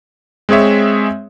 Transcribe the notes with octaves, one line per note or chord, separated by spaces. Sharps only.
G#3 C4 G#4 C#5 E5